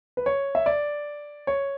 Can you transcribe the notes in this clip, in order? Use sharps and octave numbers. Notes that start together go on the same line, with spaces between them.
B4
C#5
E5
D5
C#5